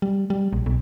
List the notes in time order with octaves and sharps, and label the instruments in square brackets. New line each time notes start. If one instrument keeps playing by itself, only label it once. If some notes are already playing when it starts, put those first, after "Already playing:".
[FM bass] G3
G3
A#1
B1